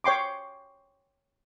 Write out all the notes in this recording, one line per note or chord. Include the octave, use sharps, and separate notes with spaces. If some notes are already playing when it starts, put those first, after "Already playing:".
C#5 G5 C6 D6